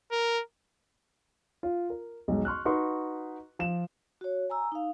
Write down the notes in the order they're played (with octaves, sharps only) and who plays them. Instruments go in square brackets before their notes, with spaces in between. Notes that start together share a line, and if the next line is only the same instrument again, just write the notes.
[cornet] A#4
[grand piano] F4
A#4
B1 G#2
C6 C#6 F6 F#6
D#4 F#4 B4 C6 C#6
F3 E7
[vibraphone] F#4 C#5
G#5 A#5 E6
D#4 F5